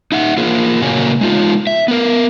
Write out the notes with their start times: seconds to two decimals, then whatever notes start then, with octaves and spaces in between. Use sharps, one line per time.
0.12 D#4 E5 F#5
0.37 A#3 F4 G#4 A#4
0.82 A#2 C#3 A#3 F#4 C#5 G#5
1.21 G#3 D#4 F4
1.67 E5
1.88 B3 A#4